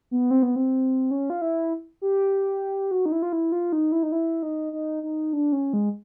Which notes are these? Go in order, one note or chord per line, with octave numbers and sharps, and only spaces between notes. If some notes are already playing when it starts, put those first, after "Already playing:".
B3
C4
B3
C4
C#4
F4
E4
G4
F#4
D#4
E4
F4
E4
F4
D#4
E4
D#4
E4
D#4
D#4
D#4
D4
C#4
G#3